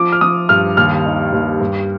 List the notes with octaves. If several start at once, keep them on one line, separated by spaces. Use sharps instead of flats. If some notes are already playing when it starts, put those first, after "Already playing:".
Already playing: F3 D6
F6
F3 D#6
G2 F6
D#2 F6
D#3
D#2
G2